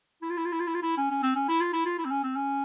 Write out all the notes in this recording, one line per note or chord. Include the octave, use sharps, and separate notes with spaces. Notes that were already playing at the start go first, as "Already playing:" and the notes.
E4
F4
E4
F4
E4
F4
E4
F4
E4
C#4
C#4
C4
C#4
E4
F4
E4
F4
E4
C4
C#4
C4
C#4